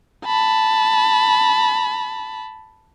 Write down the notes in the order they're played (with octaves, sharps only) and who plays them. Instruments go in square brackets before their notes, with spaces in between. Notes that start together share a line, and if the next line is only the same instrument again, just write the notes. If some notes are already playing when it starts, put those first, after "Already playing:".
[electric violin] A5 B5